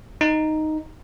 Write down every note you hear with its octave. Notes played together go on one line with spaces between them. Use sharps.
D#4